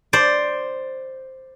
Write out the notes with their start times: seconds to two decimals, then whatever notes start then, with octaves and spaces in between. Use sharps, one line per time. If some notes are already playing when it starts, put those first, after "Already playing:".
0.13 C5 D5